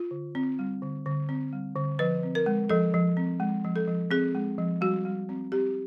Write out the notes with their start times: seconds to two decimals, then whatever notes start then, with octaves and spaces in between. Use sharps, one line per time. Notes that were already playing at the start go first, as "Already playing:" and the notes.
Already playing: F4
0.11 D3
0.35 C4
0.59 G3
0.82 D3
1.06 D3
1.29 C4
1.53 G3
1.76 D3
1.99 F3 B4
2.23 C4
2.35 A#4
2.46 G#3
2.69 F3 A4
2.94 F3
3.17 C4
3.40 G#3
3.64 F3
3.76 A4
3.87 F3
4.11 C4 G#4
4.35 G#3
4.58 F3
4.81 G3 F#4
5.05 G3
5.29 C4
5.52 C4 G4